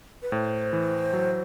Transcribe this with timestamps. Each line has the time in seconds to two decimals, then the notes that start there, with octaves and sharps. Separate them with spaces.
0.22 B4
0.32 A2 C5
0.73 E3
1.13 F#3